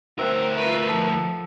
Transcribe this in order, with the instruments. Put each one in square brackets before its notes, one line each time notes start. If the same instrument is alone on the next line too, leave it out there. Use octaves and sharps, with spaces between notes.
[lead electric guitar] D2 A#4 [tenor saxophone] C4 [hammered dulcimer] E5 F#5 A#5
[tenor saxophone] A3 [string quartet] F4 B4
[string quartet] F3 [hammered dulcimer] A4